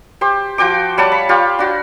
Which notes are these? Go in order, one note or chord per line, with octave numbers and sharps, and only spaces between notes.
G4 C5
F3 F#4 G5 D6
G3 C#5 F#5 A5
B5
F4 G4 F5
D4 F#4